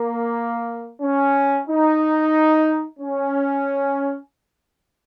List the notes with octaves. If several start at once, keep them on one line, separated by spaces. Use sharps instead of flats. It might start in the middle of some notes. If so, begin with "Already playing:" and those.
Already playing: A#3
C#4
D#4
C#4